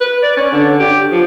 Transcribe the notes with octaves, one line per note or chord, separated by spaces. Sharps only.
B4
D5
C#4
D3
G4
F3